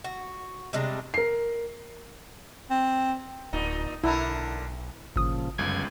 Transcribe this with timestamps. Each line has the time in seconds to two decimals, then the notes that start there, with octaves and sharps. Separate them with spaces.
0.04 F#4
0.73 C3 G3 G#3 D4
1.14 A#4 C7
2.70 C4
3.53 D1 A#2 D#4
4.04 B1 D3 D4 E4 A#4
5.16 G#1 A#2 C#3 F3 D#6
5.58 G1 C#2 F#2 G#6